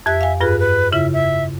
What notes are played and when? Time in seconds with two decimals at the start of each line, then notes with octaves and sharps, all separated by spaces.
0.06 F2 G4 E5 F#6
0.21 F5 G#5
0.41 G2 F4 G#4 B4
0.60 B4
0.92 C#3 E4 F4 E5
1.13 E5